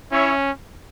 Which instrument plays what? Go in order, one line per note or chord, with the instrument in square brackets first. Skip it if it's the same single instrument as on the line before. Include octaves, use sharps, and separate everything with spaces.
[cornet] C#4 [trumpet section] E4 C#5 E5